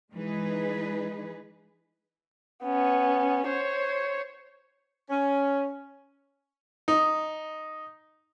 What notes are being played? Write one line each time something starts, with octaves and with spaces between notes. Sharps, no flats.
E3 G#3 D#4 G#4 B4
B3 C#4
C5 C#5
C#4
D#4